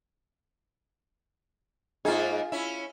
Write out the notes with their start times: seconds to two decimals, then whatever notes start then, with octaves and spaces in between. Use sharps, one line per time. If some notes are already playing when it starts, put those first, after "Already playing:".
2.05 G#2 A#3 D#4 F4 G#4
2.52 C#4 E4